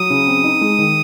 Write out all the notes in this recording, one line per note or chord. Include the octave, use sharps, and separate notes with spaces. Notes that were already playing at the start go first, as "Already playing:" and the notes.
Already playing: F#3 D#6
C#3
C4
D#4
G#3
D#3